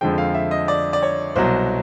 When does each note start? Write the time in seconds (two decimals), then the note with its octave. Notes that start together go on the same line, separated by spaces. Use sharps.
0.01 F2 D3 F3 G#3 G5
0.18 F5
0.34 E5
0.51 D#5
0.68 D5
0.93 D5
1.03 C#5
1.36 C2 B2 F#3 C5